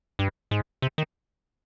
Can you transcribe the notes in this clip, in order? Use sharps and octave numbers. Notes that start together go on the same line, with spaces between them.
G2
G#2
C3
D#3